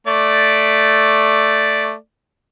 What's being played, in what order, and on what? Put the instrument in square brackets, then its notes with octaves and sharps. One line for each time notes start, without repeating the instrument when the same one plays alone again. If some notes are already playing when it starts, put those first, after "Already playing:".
[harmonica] A3 D5